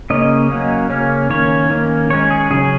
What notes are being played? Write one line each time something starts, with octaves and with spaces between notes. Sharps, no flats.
C#3 A#3 C#4 D#5
F#3 A#3 C#4
C#3 A#3 C#4
D#3 A#3 C#4 C#5
D#3 A#3 C#4
D#3 G#3 C#4 C#5
G#4
C#3 F#3 C#4 G#4